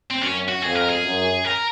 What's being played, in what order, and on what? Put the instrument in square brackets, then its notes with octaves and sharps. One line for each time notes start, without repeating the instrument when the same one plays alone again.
[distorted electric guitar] C4
[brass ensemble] F#2 [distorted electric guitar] C#4
[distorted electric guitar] F#4
[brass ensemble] F2 [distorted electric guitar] G#4
[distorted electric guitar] A#4
G#4
[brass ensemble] F#2
[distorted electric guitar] A#4